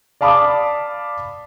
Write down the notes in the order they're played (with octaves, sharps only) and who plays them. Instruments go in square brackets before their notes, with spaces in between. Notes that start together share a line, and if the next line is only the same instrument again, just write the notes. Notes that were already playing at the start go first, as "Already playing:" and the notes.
[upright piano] D5 F5 A5 B5 D6 D#6